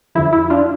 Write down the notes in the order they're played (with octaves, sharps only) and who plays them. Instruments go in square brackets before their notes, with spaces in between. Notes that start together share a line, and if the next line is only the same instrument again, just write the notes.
[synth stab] F2 D3 F3 E4
E4
D4 F4